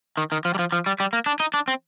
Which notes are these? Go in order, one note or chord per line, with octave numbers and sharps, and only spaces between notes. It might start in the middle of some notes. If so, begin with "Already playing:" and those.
D#3
D#3
F3
G3
F3
F3
G3
G3
A#3
D4
D#4
D4
C4